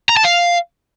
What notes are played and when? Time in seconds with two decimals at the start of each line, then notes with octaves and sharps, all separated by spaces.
0.09 A#5
0.17 A5
0.24 F5